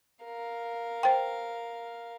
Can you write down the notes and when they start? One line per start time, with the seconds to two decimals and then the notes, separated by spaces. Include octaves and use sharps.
0.24 A#4 F5
1.03 C5 G5